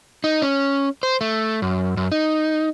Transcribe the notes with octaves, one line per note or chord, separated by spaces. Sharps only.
D#4
C#4
C5
A3
F#2
F#2
D#4